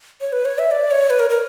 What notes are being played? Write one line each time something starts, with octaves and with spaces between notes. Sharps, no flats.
C#5
B4
C#5
E5
D5
C#5
B4
A#4
A#4